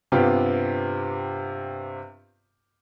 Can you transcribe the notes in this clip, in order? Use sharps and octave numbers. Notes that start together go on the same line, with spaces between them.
G2 C3 B3 F4 G4